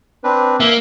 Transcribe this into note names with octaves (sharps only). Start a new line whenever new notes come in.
C4 D4 B4
A#3 E5